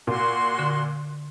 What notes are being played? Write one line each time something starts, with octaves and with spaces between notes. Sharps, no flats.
A#2 F#4 C6
D3